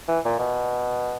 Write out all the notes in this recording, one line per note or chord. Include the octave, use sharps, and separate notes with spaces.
E3
A#2
B2